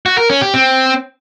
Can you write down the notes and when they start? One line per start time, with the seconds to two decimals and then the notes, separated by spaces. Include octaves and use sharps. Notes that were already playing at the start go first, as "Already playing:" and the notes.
0.06 F#4
0.18 A#4
0.30 C#4
0.42 G4
0.54 C4